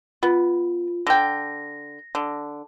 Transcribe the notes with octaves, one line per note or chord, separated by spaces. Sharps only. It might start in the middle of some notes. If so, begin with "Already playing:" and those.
B3 F4
D3 G5 A#6
D3